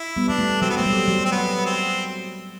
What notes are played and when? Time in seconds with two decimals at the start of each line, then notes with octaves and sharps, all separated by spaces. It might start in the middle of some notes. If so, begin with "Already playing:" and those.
Already playing: E4
0.16 G3 B3
0.28 G3 D4
0.39 A3
0.62 F#3 C4
0.70 B3
0.77 A3 C4
0.86 G3
1.08 F#3
1.25 C4
1.32 B3
1.66 C4